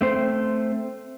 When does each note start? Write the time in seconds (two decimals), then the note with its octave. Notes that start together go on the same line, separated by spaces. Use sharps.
0.01 A3 C4 C5